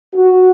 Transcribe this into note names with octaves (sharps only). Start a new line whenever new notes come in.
F#4